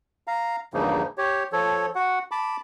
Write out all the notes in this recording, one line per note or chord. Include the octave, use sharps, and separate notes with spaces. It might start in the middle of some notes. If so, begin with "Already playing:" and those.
F5 A#5
E2 G2 C#3 F3 A#3 D#4
G4 C#5
F3 A4 C#5
F#4 F#5
A5 B5 D6